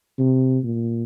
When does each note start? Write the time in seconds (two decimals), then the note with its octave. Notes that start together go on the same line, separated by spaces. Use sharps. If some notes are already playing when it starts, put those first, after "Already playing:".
0.19 C3
0.64 A#2